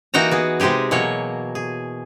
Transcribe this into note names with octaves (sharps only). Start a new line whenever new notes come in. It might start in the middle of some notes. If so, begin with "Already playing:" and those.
E3 A#3 D#4 F#4 G5 A#5
B3 G#4
C3 G#3 D#4 G4 G#4
B2 E3 F#3 A#3 C#5
G#4